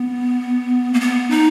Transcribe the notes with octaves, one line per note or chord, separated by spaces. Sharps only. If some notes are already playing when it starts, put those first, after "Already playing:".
Already playing: B3
A#3
B3
D#4